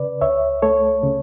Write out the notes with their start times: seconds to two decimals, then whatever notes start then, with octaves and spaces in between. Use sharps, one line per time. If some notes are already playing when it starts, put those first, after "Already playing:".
Already playing: C#3 B4 D5
0.21 C#2 C#5 E5
0.62 A3 A4 C#5
1.03 C#3